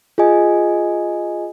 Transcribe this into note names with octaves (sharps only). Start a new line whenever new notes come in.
F4 G#4 D#5 G#5